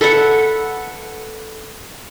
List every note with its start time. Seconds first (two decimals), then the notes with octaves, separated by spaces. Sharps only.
0.01 A4 B4 E5 F#5